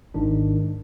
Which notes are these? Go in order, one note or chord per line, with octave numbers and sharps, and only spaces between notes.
G#1 G#2 D#3 D4